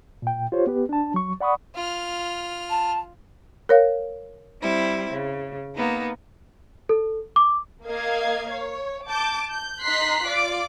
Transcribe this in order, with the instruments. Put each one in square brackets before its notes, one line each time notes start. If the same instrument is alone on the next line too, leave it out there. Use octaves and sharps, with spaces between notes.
[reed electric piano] A#2 G5
F4 G4 C5 C#5
B3 G4 B4
D4 A5
F#3 C#6
D5 F#5 B5 C#6 D#6
[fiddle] F4 F6
[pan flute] A5
[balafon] A#4 C#5 F5
[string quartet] G3 C4 E4
C#3
A#3 B3 D#4
[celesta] A4
D6
[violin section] A#3 D#5 F5 G#6
C#5
A5 D6 G6
G6
D#4 A#5 C6 F#6 B6 C7
F4 D5 D6